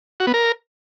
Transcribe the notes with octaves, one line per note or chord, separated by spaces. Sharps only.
F#4
B3
A#4